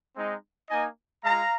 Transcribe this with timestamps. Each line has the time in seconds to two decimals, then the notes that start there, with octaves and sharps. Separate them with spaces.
0.15 G#3 C4 D#4
0.69 A#3 D#4 D#5 G#5
1.23 G#3 F4 F5 A#5